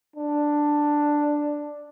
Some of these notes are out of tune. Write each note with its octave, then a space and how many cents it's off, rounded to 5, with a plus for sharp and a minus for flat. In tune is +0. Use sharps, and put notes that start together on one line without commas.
D4 +5